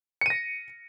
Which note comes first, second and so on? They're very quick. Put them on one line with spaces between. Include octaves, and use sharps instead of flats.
C#7 D#7 A#6